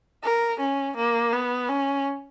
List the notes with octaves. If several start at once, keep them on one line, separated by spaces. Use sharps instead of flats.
A#4
C#4
A#3
B3
C#4